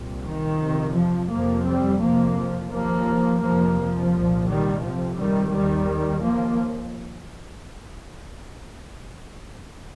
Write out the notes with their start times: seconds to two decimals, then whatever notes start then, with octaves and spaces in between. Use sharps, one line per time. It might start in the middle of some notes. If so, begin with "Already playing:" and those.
Already playing: C2 A#2
0.25 D#3
0.60 F2 C3
0.95 F3
1.30 F2 C3 F3 A#3
1.65 G3 C4
2.00 F2 C3 F3 A#3
2.36 F3
2.71 D#2 F3 A#3
3.41 F2 C3 F3 A#3
3.77 F3
4.12 C2 A#2
4.46 D#3 G3
4.82 F2 C3 F3
5.17 D#3 G3
5.52 D#2 D#3 G3
6.23 D#2 F3 A#3